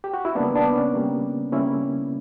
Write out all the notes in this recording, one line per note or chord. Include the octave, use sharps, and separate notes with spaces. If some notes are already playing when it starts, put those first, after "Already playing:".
G4
F#4
E4
C#3 G3 A#3 B3 D4
B3 D4
C#4
C#3 G3 A#3
C#3 G3 A#3 C#4 E4